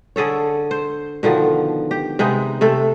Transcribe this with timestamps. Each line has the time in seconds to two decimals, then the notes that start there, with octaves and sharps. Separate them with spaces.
0.16 D3 G#4 A4 C#5
0.71 C5
1.23 B2 D3 D#3 F3
1.91 G4
2.19 C3 G#3 B3 D#4
2.61 C3 A3 A4